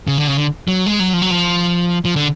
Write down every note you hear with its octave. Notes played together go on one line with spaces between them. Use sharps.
C#3
D3
C#3
D3
F#3
G#3
F#3
F3
F#3
F3
F3
D3